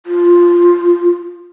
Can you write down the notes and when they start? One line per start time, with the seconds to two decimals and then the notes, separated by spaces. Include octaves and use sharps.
0.06 F4